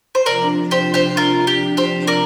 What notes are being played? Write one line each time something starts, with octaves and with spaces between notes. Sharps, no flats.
C5
C3 F3 D4 A#4 D5
G4 C5
G4 C5
F4 A#4
G4
G4 C5
A#4 D5